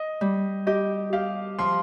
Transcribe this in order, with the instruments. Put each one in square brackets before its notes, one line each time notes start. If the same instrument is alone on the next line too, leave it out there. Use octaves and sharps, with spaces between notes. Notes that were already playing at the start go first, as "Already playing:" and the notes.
Already playing: [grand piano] D#5
[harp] G3
[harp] G4 [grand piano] D#5
[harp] G4 [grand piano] F5
[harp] F3 [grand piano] C6